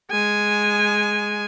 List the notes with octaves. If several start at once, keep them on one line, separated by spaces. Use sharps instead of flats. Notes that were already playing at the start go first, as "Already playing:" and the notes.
G#3 G#5